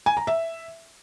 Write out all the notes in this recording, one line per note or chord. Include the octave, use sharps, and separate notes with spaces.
G#5
A#5
E5